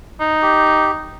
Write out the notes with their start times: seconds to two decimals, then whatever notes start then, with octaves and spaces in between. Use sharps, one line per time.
0.20 D#4
0.42 G4